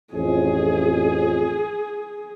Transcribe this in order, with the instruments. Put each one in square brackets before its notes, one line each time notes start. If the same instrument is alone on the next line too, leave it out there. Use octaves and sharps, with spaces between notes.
[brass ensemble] A1 F2 [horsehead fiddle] G#4